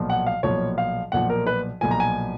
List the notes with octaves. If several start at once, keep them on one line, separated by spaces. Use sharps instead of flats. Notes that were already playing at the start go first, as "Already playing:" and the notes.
Already playing: B1 A#2 F3
F#5
F5
B1 A#2 F3 C#5
F5
B1 A#2 F3 F#5
A#4
B4
B1 A#2 F3 G#5
A#5
G#5